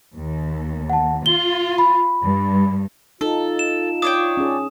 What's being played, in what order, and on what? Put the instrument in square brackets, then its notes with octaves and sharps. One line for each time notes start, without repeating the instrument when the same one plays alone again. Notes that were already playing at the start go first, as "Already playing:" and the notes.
[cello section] D#2
[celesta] F#5 A5
[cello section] F4 [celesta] G7
[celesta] B5
[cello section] G2
[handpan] D#4 [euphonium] F4 [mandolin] A4
[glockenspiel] E7
[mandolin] D4 C#5 G5 [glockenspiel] D#6
[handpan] C#4 G#4